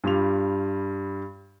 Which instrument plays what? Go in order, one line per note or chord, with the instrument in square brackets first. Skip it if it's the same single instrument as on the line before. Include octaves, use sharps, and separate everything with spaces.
[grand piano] G2 G3 F4 G4 F7